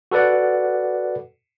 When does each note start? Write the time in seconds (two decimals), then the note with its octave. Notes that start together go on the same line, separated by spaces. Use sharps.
0.11 F#4 A4 B4 D5 F#5